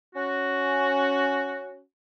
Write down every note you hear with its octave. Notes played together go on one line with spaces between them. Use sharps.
C#4 F#4